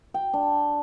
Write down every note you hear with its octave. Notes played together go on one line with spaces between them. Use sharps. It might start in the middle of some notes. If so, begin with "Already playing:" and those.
G5
D4